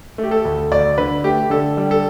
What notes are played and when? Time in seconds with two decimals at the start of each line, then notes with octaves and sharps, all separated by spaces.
0.18 A3
0.23 G4
0.31 A4
0.45 D2
0.72 D2 D5
0.98 D3 B4
1.24 A3 G4
1.50 D3 A4
1.77 G3
1.91 A4